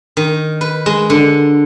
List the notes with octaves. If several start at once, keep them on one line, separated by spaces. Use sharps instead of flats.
D#3
B4
G#3
D3